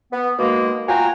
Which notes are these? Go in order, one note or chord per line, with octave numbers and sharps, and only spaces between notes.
B3
B2 D#3 G#3 A#3
F4 F#4 G5 G#5 A#5